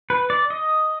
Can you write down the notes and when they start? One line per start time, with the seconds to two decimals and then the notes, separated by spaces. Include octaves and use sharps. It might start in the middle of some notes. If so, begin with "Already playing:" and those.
0.10 B4
0.30 D5
0.50 D#5